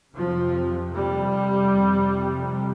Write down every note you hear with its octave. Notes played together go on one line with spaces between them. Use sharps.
F2 C3 F3
G3
F2
C3